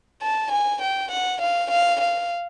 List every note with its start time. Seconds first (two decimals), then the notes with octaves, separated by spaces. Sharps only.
0.22 A5
0.52 G#5
0.82 G5
1.11 F#5
1.41 F5
1.71 F5
2.01 F5